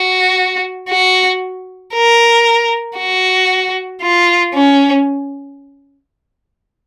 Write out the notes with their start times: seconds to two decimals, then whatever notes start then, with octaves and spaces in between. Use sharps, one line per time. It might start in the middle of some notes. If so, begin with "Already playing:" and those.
Already playing: F#4
0.89 F#4
1.94 A#4
2.98 F#4
4.02 F4
4.54 C#4